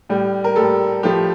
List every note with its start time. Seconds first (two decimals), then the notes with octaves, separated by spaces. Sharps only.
0.09 A2 G3
0.44 A#4
0.56 A2 G3 A4
1.03 A2 F3 A3 G4